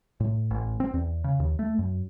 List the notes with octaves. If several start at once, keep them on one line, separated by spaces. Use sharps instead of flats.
A2
A1
C4
E2
C#3
D#2
A3
F#2